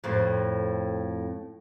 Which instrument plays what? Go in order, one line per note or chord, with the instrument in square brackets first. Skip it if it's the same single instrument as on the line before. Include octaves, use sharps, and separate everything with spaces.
[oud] F2 A2 C4